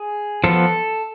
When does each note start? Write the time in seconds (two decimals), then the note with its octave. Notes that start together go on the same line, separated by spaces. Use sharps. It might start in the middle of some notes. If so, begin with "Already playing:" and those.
Already playing: G#4
0.44 F3 B3 A4